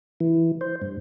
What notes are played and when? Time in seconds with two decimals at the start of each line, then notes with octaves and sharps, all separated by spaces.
0.20 E3
0.61 C5
0.82 G2